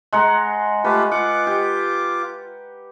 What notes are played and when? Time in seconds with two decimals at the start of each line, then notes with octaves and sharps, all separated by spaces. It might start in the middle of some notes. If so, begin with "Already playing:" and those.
0.13 G#3 F#5 A#5
0.85 A3 F4 G4 B4
1.11 F4 F#5 D6
1.47 G4